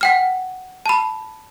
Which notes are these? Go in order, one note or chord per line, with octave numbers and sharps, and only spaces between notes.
F#5 G5 F6
A5 B5